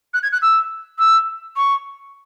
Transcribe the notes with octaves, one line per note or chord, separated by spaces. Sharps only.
F#6
G#6
F#6
E6
E6
C#6